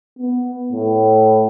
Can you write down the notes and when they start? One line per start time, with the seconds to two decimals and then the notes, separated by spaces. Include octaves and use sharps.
0.19 B3
0.72 A2